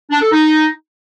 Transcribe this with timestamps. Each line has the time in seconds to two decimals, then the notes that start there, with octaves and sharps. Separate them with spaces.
0.10 D4
0.21 A4
0.32 D#4